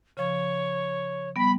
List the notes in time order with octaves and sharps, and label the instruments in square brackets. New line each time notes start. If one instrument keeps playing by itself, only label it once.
[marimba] C#3 F3 [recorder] C#5
[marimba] G3 B3 [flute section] B5